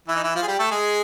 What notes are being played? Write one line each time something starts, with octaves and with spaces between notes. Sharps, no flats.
E3 E4
D#4
E3 E4
F3 F4
G#4
G3 G4
A3 A4
G#3 G#4